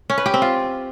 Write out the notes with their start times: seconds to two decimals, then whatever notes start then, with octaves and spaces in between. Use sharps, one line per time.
0.10 C#4
0.18 B4
0.26 G4
0.34 C4
0.42 F4